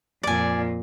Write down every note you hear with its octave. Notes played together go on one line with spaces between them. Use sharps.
F2 A#2 D5 G#5